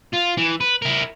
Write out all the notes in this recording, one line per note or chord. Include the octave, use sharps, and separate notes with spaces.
F4
E3
B4
E4 A#4